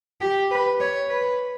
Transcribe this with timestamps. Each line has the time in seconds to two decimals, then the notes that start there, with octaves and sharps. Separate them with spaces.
0.21 G4
0.51 B4
0.80 C#5
1.09 B4